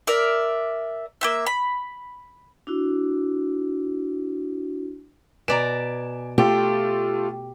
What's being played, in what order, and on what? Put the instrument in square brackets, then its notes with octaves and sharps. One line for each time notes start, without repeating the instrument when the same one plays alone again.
[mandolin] A#4 D5 E5
A#3 C4 E5
B5
[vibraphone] D4 E4 F#4
[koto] B2 D5 A#5 [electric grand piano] G#5 D7 E7
[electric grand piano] A3 F4 A4 [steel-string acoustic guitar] G4